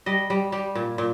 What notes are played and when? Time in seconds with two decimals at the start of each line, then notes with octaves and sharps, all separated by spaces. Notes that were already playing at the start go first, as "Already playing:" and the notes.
0.06 G3 D#5
0.30 G3
0.52 G3
0.75 A#2
0.98 A#2